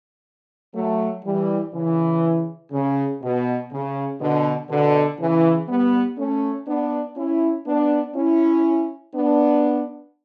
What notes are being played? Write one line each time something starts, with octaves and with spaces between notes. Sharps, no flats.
F#3 A3
E3 G3
C#3 E3
C#3
B2
C#3
B2 D3
B2 D3
C#3 E3
G3 B3
A3 C#4
B3 D4
C#4 E4
B3 D4
C#4 E4
B3 D4